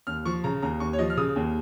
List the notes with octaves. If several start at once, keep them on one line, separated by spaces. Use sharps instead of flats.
D#2 F6
F3 C#6
C#3 A#5
D#2 A#5
D#2 C#6
C#5
F3 D#5
F6
C#3 D#6
D#2